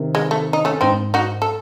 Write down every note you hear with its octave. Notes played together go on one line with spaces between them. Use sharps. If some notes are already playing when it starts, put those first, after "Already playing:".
Already playing: C3 D#3
G#3
A3
D#4
A3 C#4
G#2 C4 D#4
D#4 F#4
A4